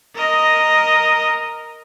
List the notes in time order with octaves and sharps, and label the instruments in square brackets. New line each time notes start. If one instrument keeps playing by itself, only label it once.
[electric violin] A#4 D#5